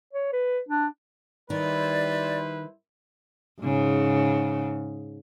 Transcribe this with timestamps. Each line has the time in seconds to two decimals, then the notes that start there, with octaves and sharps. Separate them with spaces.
0.13 C#5
0.33 B4
0.69 D4
1.50 D#3 G3 D#4 E4 B4 C5 D5
3.62 G#2 C#3